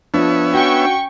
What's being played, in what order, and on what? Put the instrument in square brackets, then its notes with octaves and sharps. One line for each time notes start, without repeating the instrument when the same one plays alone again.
[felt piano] F3 [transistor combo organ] B3 C#5 E5 [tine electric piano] D4
[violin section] C#4 G5 C#6 [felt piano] F#4